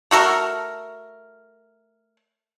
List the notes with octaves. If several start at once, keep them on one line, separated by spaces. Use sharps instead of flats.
A3 F#4 A4 A#4